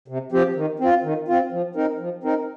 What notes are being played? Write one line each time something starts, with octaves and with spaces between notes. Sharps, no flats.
C3
F3 C4 G4
D#3
C4 F4
D#3
C4 F4
F3
C4 D#4 A#4
F3
C4 D#4 A#4